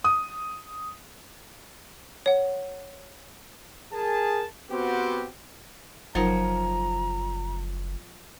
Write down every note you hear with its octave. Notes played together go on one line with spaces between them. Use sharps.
D#6
C#5 F#5
G#4 A#4 A5
B3 C4 F#4 G4
F#1 F3 F#3 D#4 A#4 C#5 A#5